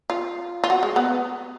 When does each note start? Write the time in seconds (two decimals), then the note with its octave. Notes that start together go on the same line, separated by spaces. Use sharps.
0.10 F4
0.64 F4
0.70 F#4
0.83 G#3
0.96 B3